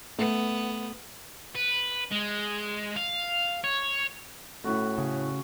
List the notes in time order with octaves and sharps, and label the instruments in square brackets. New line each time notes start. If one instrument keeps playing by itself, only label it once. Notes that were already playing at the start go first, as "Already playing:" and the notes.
[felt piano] A3 [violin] B3
[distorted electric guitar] B4
G#3
F5
C#5
[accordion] A2 [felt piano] A3 C#4 E4 [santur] F#4
[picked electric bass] C#3